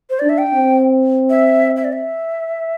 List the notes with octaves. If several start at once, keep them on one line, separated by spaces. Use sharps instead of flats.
C5
D4 D5
E5
G5
C4
E5
E5
D5
E5